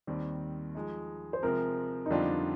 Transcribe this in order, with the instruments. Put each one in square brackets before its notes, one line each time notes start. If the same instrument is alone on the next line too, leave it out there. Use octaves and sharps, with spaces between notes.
[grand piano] D#2 D#3 G3 C4
F3 G#3 D#4
[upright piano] C5
[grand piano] C3 F3 G#3 C4 [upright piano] A#4
[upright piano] D#4
[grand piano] F2 D3 G3 C4 F4 [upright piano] D4